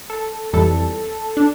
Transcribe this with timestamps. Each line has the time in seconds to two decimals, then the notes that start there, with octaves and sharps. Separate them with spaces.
0.10 A4
0.53 F2 E3 G3 A4
1.37 D4